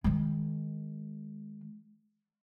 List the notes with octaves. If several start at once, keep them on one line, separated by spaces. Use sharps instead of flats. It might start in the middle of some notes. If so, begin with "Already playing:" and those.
D#3 G#3